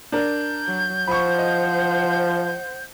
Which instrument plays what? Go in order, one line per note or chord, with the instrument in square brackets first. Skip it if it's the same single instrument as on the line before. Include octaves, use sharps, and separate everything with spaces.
[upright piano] D4 A#4 [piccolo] G6
[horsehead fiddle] F#3
[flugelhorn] F3 [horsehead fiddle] C5 F#5 [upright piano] B5 C#6
[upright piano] D#5